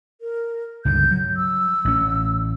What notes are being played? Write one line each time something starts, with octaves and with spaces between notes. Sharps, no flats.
A#4
C#2 G2 D3 G6
F#3
E6
A1 C#4